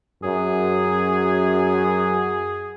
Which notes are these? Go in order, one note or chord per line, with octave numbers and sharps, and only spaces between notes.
F#2 G#4